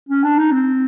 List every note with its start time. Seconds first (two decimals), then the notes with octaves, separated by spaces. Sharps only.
0.09 C#4
0.23 D4
0.38 D#4
0.52 C4